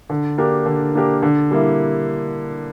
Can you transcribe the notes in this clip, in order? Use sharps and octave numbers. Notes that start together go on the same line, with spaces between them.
D3
A#3 D4 G4 A#4
D3
A#3 D4 G4 A#4
D3
G3 A#3 E4